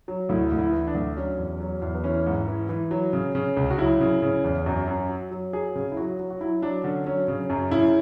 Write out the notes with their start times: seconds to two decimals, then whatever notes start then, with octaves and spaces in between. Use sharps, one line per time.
0.08 F#3
0.29 D2 E4
0.52 D2
0.58 E4
0.73 E3
0.87 D4
0.95 D2
1.17 F#3 C#4
1.38 E2
1.60 F#3
1.82 E2
1.95 B3
2.04 E3 C#4
2.26 G#2
2.48 E3
2.69 E3
2.91 F#3
3.13 C#3
3.35 C#3
3.57 C#2
3.70 F#4
3.79 F#3 E4
4.01 C#3
4.22 C#3
4.44 E2
4.66 F#2 F#4
4.88 F#2
5.09 F#3
5.31 F#3
5.53 F#3 G#4
5.76 C#3
5.92 E4
5.97 F#3 F#4
6.20 F#3
6.30 F#4
6.41 F#3 E4
6.62 F#3 D4
6.84 D3 C#4
7.06 F#3 C#4
7.28 C#3
7.50 F#2
7.71 C#3 E4